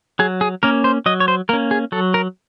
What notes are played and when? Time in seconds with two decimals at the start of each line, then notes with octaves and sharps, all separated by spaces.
0.19 F#3 G#4
0.41 G#4
0.63 A#3 C#4 A#4
0.84 C5
1.06 F#3 D#5
1.20 C#5
1.28 C5
1.49 A#3 C#4 A#4
1.71 G#4
1.92 F#3 A4
2.14 A#4